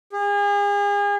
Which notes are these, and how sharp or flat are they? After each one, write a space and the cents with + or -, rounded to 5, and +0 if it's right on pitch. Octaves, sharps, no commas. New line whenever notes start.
G#4 -40